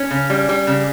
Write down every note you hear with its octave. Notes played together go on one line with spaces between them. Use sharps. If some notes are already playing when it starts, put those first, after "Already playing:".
Already playing: C#4
C#3
G3
G3
C#3